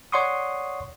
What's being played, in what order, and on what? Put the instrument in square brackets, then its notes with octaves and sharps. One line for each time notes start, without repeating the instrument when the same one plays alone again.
[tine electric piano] C#5 D5 F#5 C6 C#6 D#6